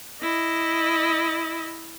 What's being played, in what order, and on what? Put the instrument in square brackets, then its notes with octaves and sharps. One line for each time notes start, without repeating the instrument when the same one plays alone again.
[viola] E4 D#5